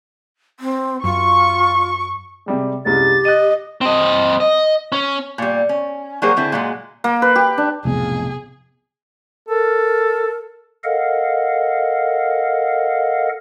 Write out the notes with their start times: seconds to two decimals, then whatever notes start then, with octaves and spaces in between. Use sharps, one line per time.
0.60 C4
1.04 F#2 F4 C#6
2.46 C3 G3 G#3
2.85 C2 F#2 G#3 G4 A6
3.25 D#5 F#6 D#7
3.81 C4 D#5
4.40 D#5
4.92 C#4
5.38 A#2 G3
5.69 C#4
6.22 F#3 G3 A#3 G#4 A#4 C5
6.36 D3 C4 E4 G#4
6.52 A#2 F#3 G#3
7.04 A#3
7.22 B4
7.35 G4
7.58 D4
7.85 B1 F2 A2 C3 B3 G#4
9.49 A4 A#4
10.84 A4 A#4 D#5 F5 F#5